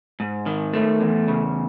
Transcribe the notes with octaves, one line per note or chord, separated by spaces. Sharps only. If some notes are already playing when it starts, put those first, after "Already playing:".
G#2
D#3
A3
E2
C#3